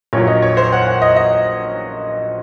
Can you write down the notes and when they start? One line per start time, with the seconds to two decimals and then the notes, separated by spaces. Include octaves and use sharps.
0.13 A#1 A#2 F#3 C#5
0.27 D#5
0.42 C#5
0.57 C5
0.72 F#5
0.87 F#5
1.02 D#5
1.16 D#5